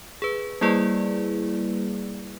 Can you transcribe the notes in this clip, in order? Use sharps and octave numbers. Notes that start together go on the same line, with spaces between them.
G#4 B4
G3 A#3 E4 G#4 B4 D5